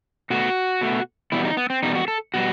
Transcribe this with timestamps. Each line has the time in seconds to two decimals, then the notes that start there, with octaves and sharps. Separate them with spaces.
0.30 B2 A3 F#4
0.81 B2 A3
1.32 E2 B2 G3 E4
1.45 D#4
1.57 B3
1.70 C4
1.83 E2 B2 G3 D#4
1.95 F#4
2.08 A4
2.34 B2 G3 F#4